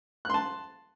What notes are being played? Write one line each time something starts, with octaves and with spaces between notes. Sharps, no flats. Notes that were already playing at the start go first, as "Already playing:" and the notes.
A5 C6 F#6